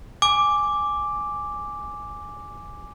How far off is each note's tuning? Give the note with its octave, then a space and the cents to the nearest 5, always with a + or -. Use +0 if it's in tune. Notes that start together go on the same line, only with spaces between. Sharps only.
G#5 +0 D6 +0